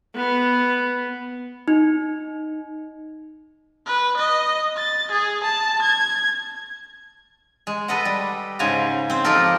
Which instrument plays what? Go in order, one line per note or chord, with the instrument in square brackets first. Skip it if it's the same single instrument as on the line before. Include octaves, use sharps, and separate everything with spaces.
[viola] B3
[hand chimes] D#4
[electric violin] B4
D#5
A6
G#4
A5
G#6
[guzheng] G#3
A4 B4 D#5 F#5
G3
G#2 C#3 C5 G#5 A#5
C4 C5
F3 D#4 F4 G4 A4 A#4